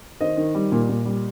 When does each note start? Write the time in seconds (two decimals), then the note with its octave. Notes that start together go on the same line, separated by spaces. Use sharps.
0.20 D#3 C5 D#5
0.37 D#3
0.55 G3
0.72 A#2
0.89 A#2
1.06 G3